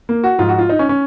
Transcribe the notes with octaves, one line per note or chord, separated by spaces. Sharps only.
A#3
F#4
G#2 F3 F4
F#4
F4
D#4
C#4
C#4